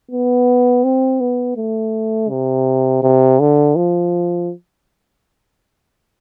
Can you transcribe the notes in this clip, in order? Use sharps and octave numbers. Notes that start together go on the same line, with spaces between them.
B3
C4
B3
A3
C3
C3
D3
F3